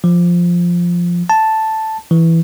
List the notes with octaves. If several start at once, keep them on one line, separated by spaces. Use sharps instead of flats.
F3
A5
E3